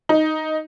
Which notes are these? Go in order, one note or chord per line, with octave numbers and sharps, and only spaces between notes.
D#4